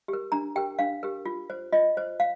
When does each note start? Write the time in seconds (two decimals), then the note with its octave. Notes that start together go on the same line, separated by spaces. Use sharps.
0.08 G4
0.13 A#4
0.32 D4 A#5
0.56 G4 A#4 G5
0.79 D4 F5
1.03 G4 A#4
1.26 F4
1.50 C5
1.72 F4 D#5
1.97 C5
2.20 F5